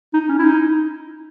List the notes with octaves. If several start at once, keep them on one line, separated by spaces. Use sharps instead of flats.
D#4
C#4
E4
D#4